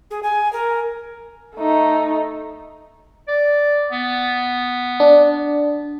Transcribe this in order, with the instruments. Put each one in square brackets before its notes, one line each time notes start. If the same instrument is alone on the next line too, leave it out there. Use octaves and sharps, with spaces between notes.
[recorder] G#4
G#5
A#4
[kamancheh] A3 D#4
[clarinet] D5
B3
[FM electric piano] D4